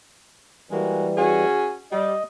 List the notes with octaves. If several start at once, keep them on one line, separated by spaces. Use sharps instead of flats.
E3 G3 G#3 A#3 F#4
C#4 F#4 G#4
G3 D#5